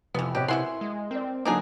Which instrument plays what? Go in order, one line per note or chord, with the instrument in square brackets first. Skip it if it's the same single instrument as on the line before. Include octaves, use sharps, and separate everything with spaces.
[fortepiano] F2 [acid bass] C3 [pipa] E3 B3
[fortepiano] B2 B4 C#5 [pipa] G4
[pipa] B2 E4 C6 [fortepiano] A#4 F#5 G#5
[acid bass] G#3
[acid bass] C4 [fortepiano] A#4 D5
[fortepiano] D3 F#3 A#3 [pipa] D4 D#4 G#4